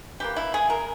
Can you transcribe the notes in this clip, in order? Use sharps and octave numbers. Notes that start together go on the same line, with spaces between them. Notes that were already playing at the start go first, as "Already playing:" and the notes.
E3 A#3 G4
E4
G#4
A#4